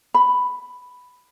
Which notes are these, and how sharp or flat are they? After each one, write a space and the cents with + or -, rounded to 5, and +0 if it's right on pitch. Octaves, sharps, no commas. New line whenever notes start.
B5 +5